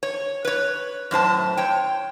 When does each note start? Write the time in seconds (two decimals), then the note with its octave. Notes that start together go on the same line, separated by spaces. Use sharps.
0.03 C#5
0.45 B4 C#5
1.11 F#2 A2 C5 A5
1.57 C#5 G5